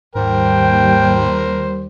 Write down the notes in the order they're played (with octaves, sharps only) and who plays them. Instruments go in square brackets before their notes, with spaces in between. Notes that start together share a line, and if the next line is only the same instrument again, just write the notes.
[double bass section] D#2 G3 [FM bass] G#2 [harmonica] A#4 C5 [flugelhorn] G5